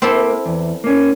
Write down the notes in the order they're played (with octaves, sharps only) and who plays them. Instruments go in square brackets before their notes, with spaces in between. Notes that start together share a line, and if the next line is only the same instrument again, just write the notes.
[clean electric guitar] A#3 [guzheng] C4 E4 A4
[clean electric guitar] E2
A#3 C#4